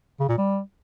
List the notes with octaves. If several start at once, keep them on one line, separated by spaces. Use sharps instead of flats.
C#3
A#2
G3